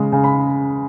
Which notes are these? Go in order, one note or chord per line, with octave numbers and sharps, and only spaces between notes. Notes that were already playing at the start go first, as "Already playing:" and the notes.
Already playing: C#3 G#3
C#3
B5